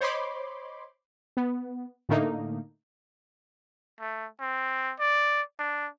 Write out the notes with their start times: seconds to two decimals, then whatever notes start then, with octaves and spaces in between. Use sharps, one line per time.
0.01 C5 C#5 D#5 B5 C6 D6
1.37 B3
2.09 A2 D3 A3 A#3 D#4
4.00 A3
4.40 C4
5.00 D5
5.59 D4